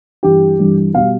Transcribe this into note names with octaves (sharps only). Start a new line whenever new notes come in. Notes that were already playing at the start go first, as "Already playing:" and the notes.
G2 E3 G3 G4
G2 E3 G3
B2 G3 F5